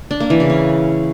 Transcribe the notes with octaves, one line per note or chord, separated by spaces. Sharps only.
D4
A#3
E3
C#3
C#4